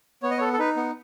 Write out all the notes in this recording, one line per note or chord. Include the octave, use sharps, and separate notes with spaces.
B3 C#5
D#5
C#5
A4
A4
D#4 B4
B3